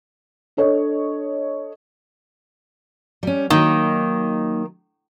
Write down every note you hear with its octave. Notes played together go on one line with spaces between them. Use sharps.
D4 A4 C#5 D#5
G3 C#4
D#3 F#3 A#3 D#4